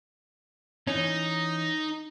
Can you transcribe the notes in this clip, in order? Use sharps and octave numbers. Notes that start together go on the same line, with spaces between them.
E3 C#4 D#4